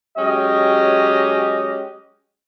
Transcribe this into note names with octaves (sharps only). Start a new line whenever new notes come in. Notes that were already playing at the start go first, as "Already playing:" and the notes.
F#3 G#3 C#4 G4 D#5